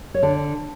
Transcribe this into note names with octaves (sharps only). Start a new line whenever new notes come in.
C#5
D3